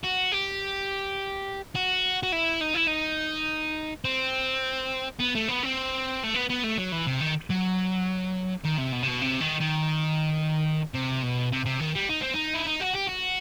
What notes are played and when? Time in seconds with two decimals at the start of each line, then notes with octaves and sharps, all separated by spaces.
0.03 F#4
0.32 G4
1.75 F#4
2.23 F#4
2.33 E4
2.61 D#4
2.75 E4
2.87 D#4
4.05 C4
5.20 B3
5.35 A3
5.48 B3
5.63 C4
6.23 A3
6.34 B3
6.49 B3
6.63 A3
6.77 F#3
6.92 E3
7.07 C3
7.21 D#3
7.50 F#3
8.64 D#3
8.78 C3
8.93 B2
9.03 C3
9.08 B2
9.22 C3
9.41 D#3
9.61 D#3
10.94 C3
11.22 B2
11.52 C3
11.65 C3
11.80 D#3
11.95 G3
12.09 D#4
12.21 C4
12.34 D#4
12.54 E4
12.66 D#4
12.81 F#4
12.95 G4
13.09 F#4